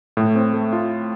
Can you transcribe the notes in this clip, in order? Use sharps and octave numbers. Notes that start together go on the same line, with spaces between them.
A2
C4
A3
F4